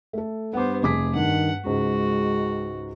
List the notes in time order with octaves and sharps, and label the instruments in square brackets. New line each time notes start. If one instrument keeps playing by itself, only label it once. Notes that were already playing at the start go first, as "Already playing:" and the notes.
[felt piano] A3 A4
[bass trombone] G2 [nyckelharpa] B3 C5 [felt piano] F#5 D6
[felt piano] F1 D6 B6 [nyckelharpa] G#4
[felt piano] G2 [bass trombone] D#3 [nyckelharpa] F#5
[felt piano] C#2 G#2 [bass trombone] G#3 [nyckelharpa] F#4